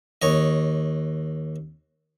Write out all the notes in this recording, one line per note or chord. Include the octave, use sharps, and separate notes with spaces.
D#2 C#5 D#5